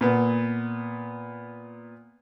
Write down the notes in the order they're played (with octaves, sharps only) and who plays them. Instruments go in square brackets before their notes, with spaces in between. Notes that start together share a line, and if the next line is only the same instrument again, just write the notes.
[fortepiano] A#2 B3